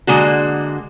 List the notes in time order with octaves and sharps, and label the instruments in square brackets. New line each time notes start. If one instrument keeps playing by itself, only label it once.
[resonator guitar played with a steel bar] D3 G#3 A#3 F#4